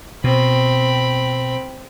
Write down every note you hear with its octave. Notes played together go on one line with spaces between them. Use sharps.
B2 C4 B5